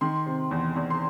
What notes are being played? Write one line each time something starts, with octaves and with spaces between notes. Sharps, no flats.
D#3 C6
C3
E2
E2
C6